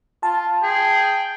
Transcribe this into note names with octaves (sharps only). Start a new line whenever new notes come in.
F4 A5
G#4 G5